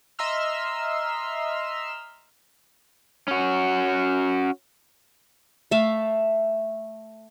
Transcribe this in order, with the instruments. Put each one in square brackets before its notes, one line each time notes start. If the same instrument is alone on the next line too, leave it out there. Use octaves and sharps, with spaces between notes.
[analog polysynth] D#5 E5 A#5 C6 E6 F6
[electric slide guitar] C#4 F#4
[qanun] A3 E5 F5